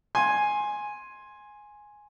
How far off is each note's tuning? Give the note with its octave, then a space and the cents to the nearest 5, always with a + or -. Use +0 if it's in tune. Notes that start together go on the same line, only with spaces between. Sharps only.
G#5 +0 C6 +15